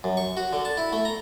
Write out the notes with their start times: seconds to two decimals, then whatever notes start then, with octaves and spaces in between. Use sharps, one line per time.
0.04 F#2
0.17 C#6
0.37 F#4
0.53 D3
0.65 A5
0.77 E4
0.93 A3
1.05 A#5